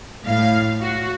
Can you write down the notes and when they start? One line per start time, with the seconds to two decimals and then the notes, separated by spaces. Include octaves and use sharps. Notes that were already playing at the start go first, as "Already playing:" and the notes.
0.24 A2 F5
0.81 F#4